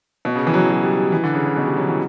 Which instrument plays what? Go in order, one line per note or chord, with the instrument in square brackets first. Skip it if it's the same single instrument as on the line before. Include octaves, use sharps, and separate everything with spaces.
[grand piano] B2
C#3
E3
F#3
E3
F#3
G3
G3
E3
D3
C#3
C#3
B2
G3
F#3
E3